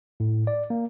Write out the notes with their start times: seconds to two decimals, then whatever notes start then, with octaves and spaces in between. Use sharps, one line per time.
0.20 A2
0.47 D5
0.70 A#3